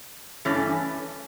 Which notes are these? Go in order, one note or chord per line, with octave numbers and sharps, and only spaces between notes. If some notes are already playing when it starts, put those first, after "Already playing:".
G2 E3 A3 C#4